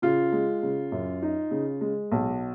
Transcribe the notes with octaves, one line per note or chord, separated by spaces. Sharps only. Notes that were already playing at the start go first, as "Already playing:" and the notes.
C#3 F4
G#3
C#3
F#2
D#4
C#3
G#3
B1